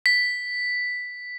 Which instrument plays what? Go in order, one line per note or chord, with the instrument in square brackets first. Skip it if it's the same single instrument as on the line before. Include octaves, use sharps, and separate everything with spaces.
[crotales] B6